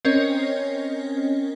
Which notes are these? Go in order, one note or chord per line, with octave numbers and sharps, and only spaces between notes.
C4 C#4 A#4 C#5 D#5